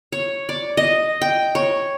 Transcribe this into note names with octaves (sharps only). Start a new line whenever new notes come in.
C#5
D5
D#5
G5
C#5